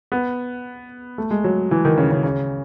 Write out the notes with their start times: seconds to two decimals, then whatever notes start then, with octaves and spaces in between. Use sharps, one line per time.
0.12 B3
1.18 A3
1.31 G#3
1.44 F#3
1.71 E3
1.85 D#3
1.97 C#3
2.11 C#3
2.23 C#3